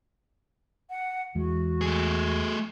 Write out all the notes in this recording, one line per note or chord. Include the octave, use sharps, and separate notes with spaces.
F#5
E2 E3 G#3 F#4
A3 G#4